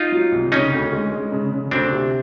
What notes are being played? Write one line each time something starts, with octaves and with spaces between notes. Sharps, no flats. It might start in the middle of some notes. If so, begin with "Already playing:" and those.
Already playing: D#4 F4
F#3
C2
C#3 C#4 D#4
D2
G#3
G#3
C#3
C#3
D2 C4 D4
C3